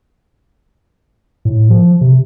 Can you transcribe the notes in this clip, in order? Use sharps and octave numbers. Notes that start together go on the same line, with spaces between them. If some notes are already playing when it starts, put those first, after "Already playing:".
A2
F3
C3